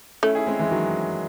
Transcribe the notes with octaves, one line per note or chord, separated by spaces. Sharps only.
A3 C#4 E4
E4 G#4
G#3 C4
E3 G#3
D#3 F#3